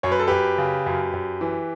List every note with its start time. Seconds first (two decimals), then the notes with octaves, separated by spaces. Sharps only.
0.03 F#2 C#5
0.12 B4
0.20 A4
0.27 F#2 G4 B4
0.58 C#3
0.86 F#2
1.13 F#2
1.41 E3